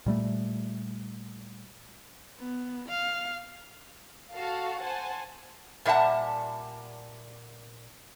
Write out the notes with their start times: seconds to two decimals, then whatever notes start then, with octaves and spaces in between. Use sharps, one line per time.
0.06 A#2 G3 A3
2.38 B3
2.89 F5
4.34 F#4 A4 F5 A5
4.80 C5 F#5 G#5 A5
5.85 A#2 G3 E5 F#5 A5